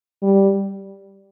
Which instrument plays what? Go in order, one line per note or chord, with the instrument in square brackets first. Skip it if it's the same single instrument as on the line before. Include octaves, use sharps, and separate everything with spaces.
[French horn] G3